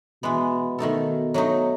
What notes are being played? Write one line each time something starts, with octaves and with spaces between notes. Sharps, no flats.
B2 E3 G#3 B3
B2 D#3 A3 D#4 A4
F#3 A3 D#4